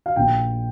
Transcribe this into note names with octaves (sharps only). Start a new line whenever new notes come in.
F5
A#1 A#2 G5